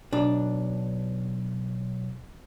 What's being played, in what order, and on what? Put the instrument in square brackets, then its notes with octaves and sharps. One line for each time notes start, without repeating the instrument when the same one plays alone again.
[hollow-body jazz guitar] B1 D4